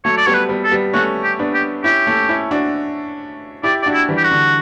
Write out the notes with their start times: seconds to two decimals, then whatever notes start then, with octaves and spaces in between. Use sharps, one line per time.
0.04 F#3 A3 C#5
0.17 D5
0.26 G3 B3 C#5
0.34 B4
0.49 G3 B3
0.64 A4
0.72 G3 B3
0.93 A3 C#4 F#4
1.24 G4
1.39 B3 D4
1.54 G4
1.84 C#4 E4 G4
2.07 A3 C#4
2.29 C#4 E4
2.51 D4 F#4
3.63 E4 G4 D5
3.83 D5
3.86 D4 F#4
3.93 E4
4.09 E3 G3
4.17 G4
4.24 F#4
4.31 D3